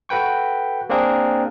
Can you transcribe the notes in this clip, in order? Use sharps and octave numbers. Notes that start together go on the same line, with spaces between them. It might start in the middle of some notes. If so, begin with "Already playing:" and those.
F#4 A4 B4 G5 C#6
A#3 C4 D4 G#4 A#4